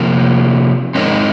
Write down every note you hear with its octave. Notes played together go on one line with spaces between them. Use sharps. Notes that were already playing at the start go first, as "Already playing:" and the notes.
Already playing: C3 F3 A#3
G#3 C4 D#4 A#4 C#5